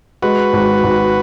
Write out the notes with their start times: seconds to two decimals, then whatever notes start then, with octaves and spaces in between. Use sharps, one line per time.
0.22 G#3 F#4 B4
0.53 G#1
0.84 G#1